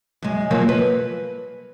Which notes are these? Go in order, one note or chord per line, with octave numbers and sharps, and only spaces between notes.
F#2 G#3
F3 F#3 A#3
B4